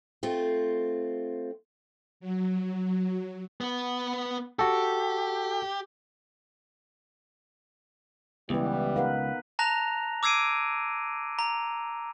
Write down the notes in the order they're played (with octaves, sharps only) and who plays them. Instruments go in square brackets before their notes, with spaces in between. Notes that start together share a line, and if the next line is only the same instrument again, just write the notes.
[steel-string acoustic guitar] A3 C4 F4
[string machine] F#3
[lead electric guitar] B3 B4
[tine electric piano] F#4 A4 [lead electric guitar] G4
[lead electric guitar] C#2 [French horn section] E3 G3 [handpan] B3 B4
[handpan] D#4 A#4 B4 [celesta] F5 F#5
[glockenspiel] A5 A#5 F#6 A#6 F7
D6 E6 G#6 C7 D7 D#7
A#5